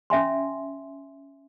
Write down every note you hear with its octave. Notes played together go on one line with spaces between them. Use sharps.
C#4 E5 G#5 C6